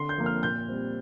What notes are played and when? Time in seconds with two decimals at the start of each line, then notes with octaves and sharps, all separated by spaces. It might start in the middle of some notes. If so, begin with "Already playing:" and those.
Already playing: D3 C6
0.09 G6
0.18 F3 A#3
0.26 F6
0.43 A#2 G6
0.68 G3 C4